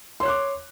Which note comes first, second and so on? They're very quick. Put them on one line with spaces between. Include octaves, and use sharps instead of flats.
C6 C#5 F#6 D6